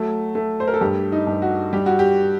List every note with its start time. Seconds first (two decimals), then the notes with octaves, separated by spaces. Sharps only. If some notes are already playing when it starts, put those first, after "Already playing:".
Already playing: F#3 A3
0.35 A3
0.60 C5
0.68 A#4
0.74 A4
0.81 G2 G4
1.12 D#4
1.27 G2
1.42 F#4
1.73 G3 G4
1.86 F#4
1.99 G4